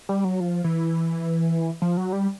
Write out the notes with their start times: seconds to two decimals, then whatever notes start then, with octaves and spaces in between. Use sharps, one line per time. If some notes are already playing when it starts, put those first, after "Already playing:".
0.09 G3
0.24 F#3
0.40 F3
0.64 E3
1.82 F3
1.97 F#3
2.13 G3